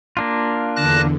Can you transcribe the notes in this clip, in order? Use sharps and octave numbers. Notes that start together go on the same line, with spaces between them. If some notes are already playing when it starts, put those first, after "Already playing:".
A#3 D4 F4
E2 D3 A5 F#6 A#6